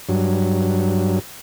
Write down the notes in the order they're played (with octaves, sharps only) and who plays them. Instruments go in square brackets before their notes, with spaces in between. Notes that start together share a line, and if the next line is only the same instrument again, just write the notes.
[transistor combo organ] G2 F#3